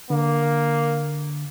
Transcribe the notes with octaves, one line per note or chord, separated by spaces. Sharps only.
D3 A#3